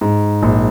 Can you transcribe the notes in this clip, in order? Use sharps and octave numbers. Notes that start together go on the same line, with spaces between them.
G#2
A#1